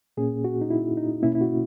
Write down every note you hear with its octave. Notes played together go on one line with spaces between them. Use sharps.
A#2 A#3 C#4 G#4
F#4
D#4
E4
D#4
B2 A#3 C#4 E4
E4
F#4